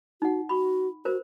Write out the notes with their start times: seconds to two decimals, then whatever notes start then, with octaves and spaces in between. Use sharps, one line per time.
0.22 D#4 F#4 F#5
0.49 F#4 B5 C#6
1.05 F#4 A#4 C5